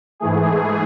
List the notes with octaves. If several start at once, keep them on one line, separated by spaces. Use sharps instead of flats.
G#2 E3 A3 G#4